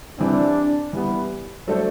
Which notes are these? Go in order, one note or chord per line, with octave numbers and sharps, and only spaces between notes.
C3 E3 G3 C4 D4
E3 G3 B3
F#3 A3 D4 A4 C5